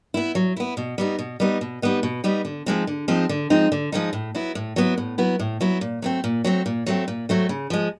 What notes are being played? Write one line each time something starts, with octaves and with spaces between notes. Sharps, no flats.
B3 E4
F#3
B3 E4
B2
G3 B3 D#4
B2
G3 B3 D#4
B2
G3 B3 D#4
B2
G3 B3 D#4
D3
F3 G#3 C4 D#4
D3
F3 G#3 C4 D#4
D3
F3 G#3 C4 D#4
D3
F3 G#3 C4 D#4
A2
F#3 B3 E4
A2
F#3 B3 E4
A2
F#3 B3 E4
A2
F#3 B3 E4
A#2
F#3 A3 C4
A#2
F#3 A3 C4
A#2
F#3 A3 C4
A#2
F#3 A3 C4
C#3
F3 G#3